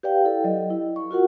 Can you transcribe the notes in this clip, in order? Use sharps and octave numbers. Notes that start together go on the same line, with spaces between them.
G4 B4 D5 F5 G5
E4 A4
F#3 D#5
E4
C#6
F4 F#4 A#4 F#5